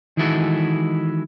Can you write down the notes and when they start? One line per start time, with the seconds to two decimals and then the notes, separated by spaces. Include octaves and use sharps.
0.17 D#3 E3 G#3 E4 F#4 A4